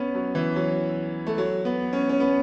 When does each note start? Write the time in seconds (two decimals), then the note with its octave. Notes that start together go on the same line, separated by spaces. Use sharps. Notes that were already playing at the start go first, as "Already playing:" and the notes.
Already playing: B3 C#4
0.15 F#3
0.35 E3
0.56 F#3
1.27 A3
1.38 F#3
1.65 B3
1.93 C#4
2.09 C#4
2.20 B3